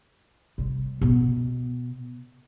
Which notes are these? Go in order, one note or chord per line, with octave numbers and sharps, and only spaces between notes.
C3 G3
B2 B3